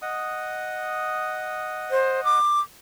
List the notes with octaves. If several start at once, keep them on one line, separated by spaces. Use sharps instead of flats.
D#5 F#5 D#6
C5
D6